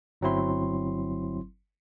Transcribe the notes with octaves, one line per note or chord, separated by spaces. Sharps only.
G1 F#3 C4 E4 C6